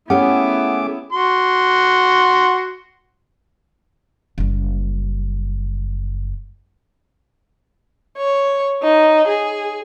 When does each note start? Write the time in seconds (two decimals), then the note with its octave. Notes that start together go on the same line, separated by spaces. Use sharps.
0.10 A3 B3 C#4 E4 G4 G#4 F#5 D6
1.12 F#4 C6
4.38 F#1 G3
8.18 C#5
8.82 D#4
9.28 G#4